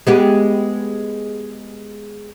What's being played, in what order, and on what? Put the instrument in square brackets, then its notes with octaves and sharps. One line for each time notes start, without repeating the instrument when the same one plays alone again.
[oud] G#3 B3 G4